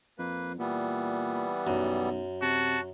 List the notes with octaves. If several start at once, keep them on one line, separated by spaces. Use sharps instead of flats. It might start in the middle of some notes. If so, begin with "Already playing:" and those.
F2 A#3 B4
A#2 E3 G3 B3
B1 F#2
C3 F#4 A5